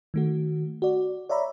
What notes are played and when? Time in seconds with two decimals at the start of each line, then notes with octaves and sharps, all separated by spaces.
0.14 D#3 A3 F#4
0.82 F#4 D5
1.29 C#5 D5 E5 A#5 B5